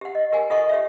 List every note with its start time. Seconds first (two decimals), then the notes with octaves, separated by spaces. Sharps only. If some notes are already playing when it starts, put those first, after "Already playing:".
0.01 G4 F#5
0.15 D#5
0.32 G4 A#4 F#5 G#5
0.50 F4 A4 D#5 F#5 C#6
0.69 G4 C#5 E5